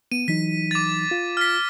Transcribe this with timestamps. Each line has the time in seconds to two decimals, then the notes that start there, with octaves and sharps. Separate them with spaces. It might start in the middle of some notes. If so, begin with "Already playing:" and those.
0.12 B3 D#7
0.28 E3 F#3 D#4 B6
0.71 D6 A6
1.11 F4
1.37 F6 B6